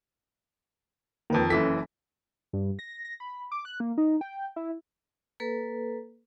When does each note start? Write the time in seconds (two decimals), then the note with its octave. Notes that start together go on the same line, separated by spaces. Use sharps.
1.30 F2 D#3 A#3 B4
1.50 F#1 E3 C#4 A4 B6
2.53 G2
2.79 A#6
3.05 A#6
3.20 B5
3.52 D6
3.65 F#6
3.80 A#3
3.98 D#4
4.21 G5
4.56 E4
5.40 A#3 A4 B4